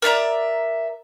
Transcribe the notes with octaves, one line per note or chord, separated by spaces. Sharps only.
A#4 D5 E5 A#5